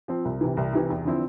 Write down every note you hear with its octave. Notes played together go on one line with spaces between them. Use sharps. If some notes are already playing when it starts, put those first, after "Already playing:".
F3 C4
C2
C3 E3
C2
C3 E3
E2
D3 F3 C4 E4